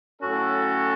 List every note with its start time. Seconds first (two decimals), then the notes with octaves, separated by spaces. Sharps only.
0.21 A2 F#3 C#4 F#4 A4